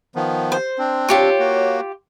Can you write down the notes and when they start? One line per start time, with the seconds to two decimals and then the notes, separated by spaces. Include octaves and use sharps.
0.15 D#3 F3 B3
0.52 C5
0.78 C4 D4
1.09 F4 G4 C#5 C#6
1.39 A#3 F#4